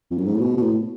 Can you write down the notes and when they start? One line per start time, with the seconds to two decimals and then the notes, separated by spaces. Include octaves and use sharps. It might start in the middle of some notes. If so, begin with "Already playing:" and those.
0.11 F2
0.18 F#2
0.26 G#2
0.34 A2
0.42 B2
0.57 B2
0.62 A2